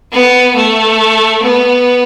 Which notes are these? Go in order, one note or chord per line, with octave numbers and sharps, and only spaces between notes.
B3
A3
B3